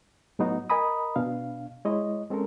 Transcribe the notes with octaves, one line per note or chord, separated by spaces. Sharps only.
A2 F#3 B3 D#4 F#4
A#4 D#5 G#5 A#5 B5 D#6
B2 D4 F5
G#3 E4 C#5 D#5
G#3 C4 C#4 A4 A#4